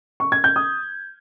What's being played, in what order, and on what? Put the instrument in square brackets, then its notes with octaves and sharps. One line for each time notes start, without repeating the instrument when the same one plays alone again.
[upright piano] C#6
G#6
G6
D#6